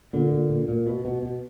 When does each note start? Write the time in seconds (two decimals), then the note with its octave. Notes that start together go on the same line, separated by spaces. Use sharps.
0.13 A#2 D3
0.32 A#2
0.50 A#2
0.68 A#2
0.87 B2
1.05 B2
1.22 B2